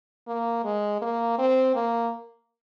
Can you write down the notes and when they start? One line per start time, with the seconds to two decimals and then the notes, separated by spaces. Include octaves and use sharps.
0.27 A#3
0.64 G#3
1.02 A#3
1.38 C4
1.75 A#3